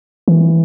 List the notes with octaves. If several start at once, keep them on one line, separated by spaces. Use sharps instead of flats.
E3